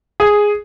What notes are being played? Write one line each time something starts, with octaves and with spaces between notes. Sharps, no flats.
G#4